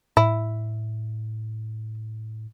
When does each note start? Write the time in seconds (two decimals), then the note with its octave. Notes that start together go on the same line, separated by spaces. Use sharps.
0.17 A2 E4